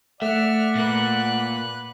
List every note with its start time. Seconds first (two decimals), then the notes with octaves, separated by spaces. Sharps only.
0.22 A3 D5 E5 F#5 F6
0.75 A#2 A#3 B4 F#6